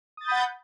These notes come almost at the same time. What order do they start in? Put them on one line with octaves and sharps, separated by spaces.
D#6 A6 G6 B5 F#5